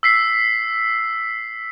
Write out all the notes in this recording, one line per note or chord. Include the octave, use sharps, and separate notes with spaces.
E6 B6 C7